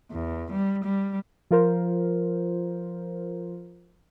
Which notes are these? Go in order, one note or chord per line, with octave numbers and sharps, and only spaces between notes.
E2
G3
G3
F3 F4 A#4 C5